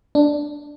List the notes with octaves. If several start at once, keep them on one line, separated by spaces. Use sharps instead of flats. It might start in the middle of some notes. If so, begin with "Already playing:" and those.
D4